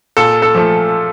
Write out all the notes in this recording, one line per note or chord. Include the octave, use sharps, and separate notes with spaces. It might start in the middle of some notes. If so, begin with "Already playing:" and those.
A#2 A4
A4
F3 A3